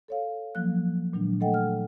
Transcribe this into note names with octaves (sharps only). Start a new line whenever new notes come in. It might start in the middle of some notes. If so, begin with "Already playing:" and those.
A4 C#5 F5
F3 F#3 A#3 F#6
A#2 D#3 F#3 G#3 D4
A3 A4 D#5 F#5 G5
F6